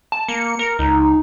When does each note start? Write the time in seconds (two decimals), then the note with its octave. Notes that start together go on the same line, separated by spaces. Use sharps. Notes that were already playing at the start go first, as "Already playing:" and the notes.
0.12 A5
0.28 A#3 C#7
0.59 A#4
0.79 C#2 D#4